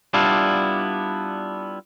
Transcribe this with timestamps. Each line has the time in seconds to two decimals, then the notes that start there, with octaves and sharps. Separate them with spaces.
0.14 G3 B3 D4 E4 F4